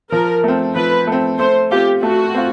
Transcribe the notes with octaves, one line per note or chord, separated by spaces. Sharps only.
F3 A#4
A3 C4
F3 B4
A3 C4
A3 C5
C4 F4 G4
A3 F#4
C4 F4